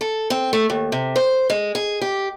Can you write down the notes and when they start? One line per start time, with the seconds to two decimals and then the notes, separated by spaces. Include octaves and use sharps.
0.01 A4
0.30 C4
0.53 A3
0.70 D#2
0.92 C3
1.16 C5
1.50 G#3
1.75 G#4
2.01 G4